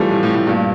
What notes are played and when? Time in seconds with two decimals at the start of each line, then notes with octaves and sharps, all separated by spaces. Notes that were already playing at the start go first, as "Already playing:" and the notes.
Already playing: E3 F3 G3 A3
0.11 A2
0.23 A2
0.35 A2
0.47 G2 A#2